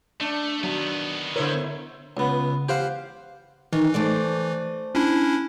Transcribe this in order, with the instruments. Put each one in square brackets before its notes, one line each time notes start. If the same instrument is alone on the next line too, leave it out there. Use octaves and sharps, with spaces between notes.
[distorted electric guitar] A3 [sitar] D4
[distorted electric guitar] D#3 B3 [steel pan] F#3
[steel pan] D3 A#4 [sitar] E4 C5 C#5
[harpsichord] C#2 B3
G4 C5 F5 F#5
[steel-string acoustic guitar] D#3 [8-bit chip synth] E3
[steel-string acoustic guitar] A3 C5 D5
[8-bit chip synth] C#4 D4 E4